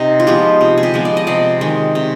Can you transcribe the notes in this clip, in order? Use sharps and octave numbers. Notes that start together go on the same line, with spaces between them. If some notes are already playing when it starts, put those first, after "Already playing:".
Already playing: C3 D#4
F4
F3 G#3 B3 G4
C3
G#4
G4
F3 G#3 B3
D5
D#5
C3 D5
D#3 G#3
C3